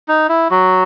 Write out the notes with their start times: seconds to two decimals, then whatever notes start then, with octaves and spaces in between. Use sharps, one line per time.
0.08 D#4
0.29 E4
0.51 F#3 F#4